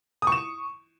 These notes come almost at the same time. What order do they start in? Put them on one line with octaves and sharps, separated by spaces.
D#6 C#6 E7